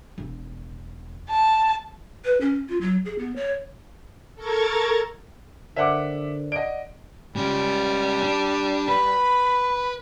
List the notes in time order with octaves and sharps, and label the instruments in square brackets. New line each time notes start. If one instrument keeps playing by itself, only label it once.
[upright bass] E1
[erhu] A5
[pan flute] B4
C#4
F4
F#3
G#4
B3
C#5
[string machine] A4 A#4 A#5 C#6 G#6 A6
[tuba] D3 [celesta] A#4 C5 D5 [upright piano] E5 F#5 D6
[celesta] D5 F#5 [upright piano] D#5 D7
[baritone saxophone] G3 [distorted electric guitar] G#3 C#4
[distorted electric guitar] D4
[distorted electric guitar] B4 [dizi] B5